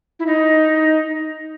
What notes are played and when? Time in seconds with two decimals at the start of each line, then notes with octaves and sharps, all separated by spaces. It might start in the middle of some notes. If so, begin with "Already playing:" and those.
0.19 E4
0.27 D#4